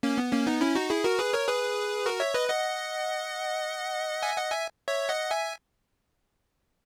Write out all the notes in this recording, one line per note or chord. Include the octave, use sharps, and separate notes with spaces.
A#3 C#4
B3
A#3 C#4
B3 D#4
C#4 E4
D#4 F#4
E4 G#4
F#4 A#4
G#4 B4
A#4 C#5
G#4 B4
F#4 A#4
C#5 E5
B4 D#5
D#5 F#5
E5 G#5
D#5 F#5
E5 G#5
C#5 E5
D#5 F#5
E5 G#5